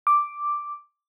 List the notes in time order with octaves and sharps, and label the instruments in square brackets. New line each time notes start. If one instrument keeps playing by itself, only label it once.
[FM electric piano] D6